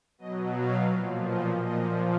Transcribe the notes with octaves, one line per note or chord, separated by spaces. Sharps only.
B2 F#3 D#5
F5
A#2 F3
D#5
A#2 F3 D#5